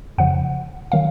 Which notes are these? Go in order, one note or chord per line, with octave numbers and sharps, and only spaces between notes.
F2 C#3 F3 F#5
D#3 F#3 F5